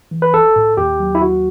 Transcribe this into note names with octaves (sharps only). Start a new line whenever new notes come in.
E3
B4
B1 A4
A2
D#2 G4
F#3
E4
D#2 F#4